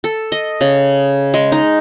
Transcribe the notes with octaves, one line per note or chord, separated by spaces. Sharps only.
A4
D#5
C#3
G#3
D#4